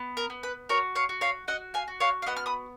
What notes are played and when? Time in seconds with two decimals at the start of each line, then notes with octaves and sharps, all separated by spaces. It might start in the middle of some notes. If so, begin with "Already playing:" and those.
Already playing: B3
0.17 A#4
0.30 B3
0.43 B4
0.69 F#4 A#4 C#5
0.95 C#5 F5
1.09 F#4
1.21 C#5 F5
1.48 F#4 D#5 F#5
1.74 F5 G#5
1.88 F#4
2.00 C#5 F5
2.22 F5
2.26 B3 D#5 F#5
2.36 F6
2.46 B5 D#6